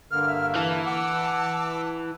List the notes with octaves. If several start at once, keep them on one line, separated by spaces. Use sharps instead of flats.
G2 D3 A#3 F6
E5
E3 A5
F#5 D6 E6